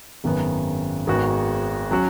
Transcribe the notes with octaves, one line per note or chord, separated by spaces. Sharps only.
G#1 F#2 D#3 B3
G#1 G#2 D#3 B3 F#4
F#3 C#4 F#4